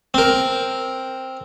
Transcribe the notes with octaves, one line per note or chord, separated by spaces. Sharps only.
C4 A#4